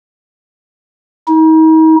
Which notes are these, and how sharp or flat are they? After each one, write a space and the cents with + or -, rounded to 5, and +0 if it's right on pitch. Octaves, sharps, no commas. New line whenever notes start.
D#4 +40